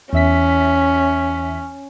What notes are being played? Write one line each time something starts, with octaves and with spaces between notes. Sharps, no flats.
E2 C#4 E5 B6